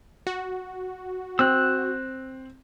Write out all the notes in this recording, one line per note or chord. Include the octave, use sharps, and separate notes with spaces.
F#4
C4 E6 F#6